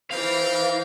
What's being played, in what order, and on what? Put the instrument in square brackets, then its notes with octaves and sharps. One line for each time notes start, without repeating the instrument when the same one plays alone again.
[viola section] E3 [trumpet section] A#4 G5 [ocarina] C5 [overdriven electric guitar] F5